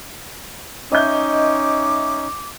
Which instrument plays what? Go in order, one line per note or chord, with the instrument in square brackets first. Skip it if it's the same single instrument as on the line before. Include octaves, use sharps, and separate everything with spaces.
[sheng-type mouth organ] C#4 D#4 [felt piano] D#5 E5 G6 [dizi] D6